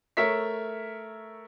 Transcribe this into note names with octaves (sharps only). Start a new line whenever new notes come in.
A3 A#4 C#5 E5 B6